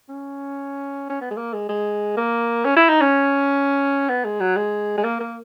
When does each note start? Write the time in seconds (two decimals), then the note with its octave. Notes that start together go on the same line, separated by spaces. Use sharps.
0.09 C#4
1.10 C#4
1.21 B3
1.31 G#3
1.37 A#3
1.53 G#3
1.69 G#3
2.17 A#3
2.65 C#4
2.76 E4
2.89 D#4
3.01 C#4
4.09 B3
4.25 G#3
4.40 F#3
4.56 G#3
4.97 G#3
5.04 A#3
5.20 A#3